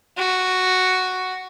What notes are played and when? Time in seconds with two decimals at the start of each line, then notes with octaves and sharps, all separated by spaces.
0.17 F#4